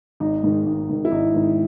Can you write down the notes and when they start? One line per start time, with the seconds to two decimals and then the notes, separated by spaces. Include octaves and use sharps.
0.20 G#1 D#4
0.43 G#2 D#3
0.66 G#1
0.89 G#2 D#3
1.05 E4
1.11 G#1 D#4
1.35 G#2 D#3